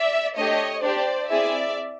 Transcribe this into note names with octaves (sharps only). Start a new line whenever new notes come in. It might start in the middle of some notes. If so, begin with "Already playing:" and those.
Already playing: D5 E5
A3 D4 G4 C#5 D#5
D4 G4 C5 D5
C4 E4 G#4 D5 E5